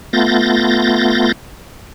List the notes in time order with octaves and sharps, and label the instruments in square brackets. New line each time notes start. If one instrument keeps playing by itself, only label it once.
[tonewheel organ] A3 B3 F4 G6 A6 A#6